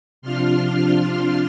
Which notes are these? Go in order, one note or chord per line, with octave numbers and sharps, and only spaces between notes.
C3 F3 D4 F4 C6 F6